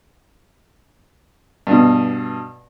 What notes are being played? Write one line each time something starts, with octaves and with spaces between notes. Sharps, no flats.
G2 B2